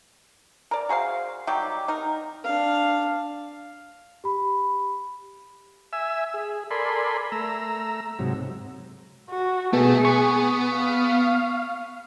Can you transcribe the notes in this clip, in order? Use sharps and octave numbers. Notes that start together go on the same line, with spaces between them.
A#4 D5
F#4 G#4 C5 F5
D#3 F#3 G3 G4
D#4 A#4
D4 F5
G4 B5
E5 G#5 E6
G#4
A4 A#4 D5 G#5 B5 C6
A3 A#5 E6
G#2 C3 F#3
F#4
B2 A3 G#4 A4
B3 C#6
F5